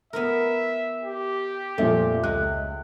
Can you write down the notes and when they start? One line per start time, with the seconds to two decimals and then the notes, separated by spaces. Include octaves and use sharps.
0.13 B3 E4 A#4 E5
1.02 G4
1.78 F2 A#2 F3 A3 A4 E5
2.24 C#2 G#3 F#6